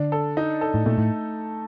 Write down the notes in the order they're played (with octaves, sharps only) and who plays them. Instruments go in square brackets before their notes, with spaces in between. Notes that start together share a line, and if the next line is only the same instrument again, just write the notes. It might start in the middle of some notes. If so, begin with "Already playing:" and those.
Already playing: [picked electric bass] D3 [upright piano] D4
[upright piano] A4
D#4
A4
[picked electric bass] A2
[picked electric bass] A#2 [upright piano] A3
[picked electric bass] A2